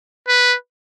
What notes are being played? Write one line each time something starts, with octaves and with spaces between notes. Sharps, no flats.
B4